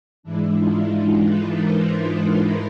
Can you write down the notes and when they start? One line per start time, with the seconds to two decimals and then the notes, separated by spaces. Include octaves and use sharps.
0.23 G#2 E3 G#3 D4 E4
0.56 D#4 F4
0.89 D#4 F4
1.22 A4 B4
1.55 A#4 C5
2.21 A#4 C5